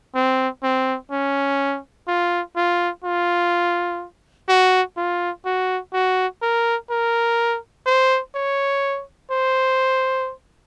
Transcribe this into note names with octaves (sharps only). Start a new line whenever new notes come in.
C4
C4
C#4
F4
F4
F4
F#4
F4
F#4
F#4
A#4
A#4
C5
C#5
C5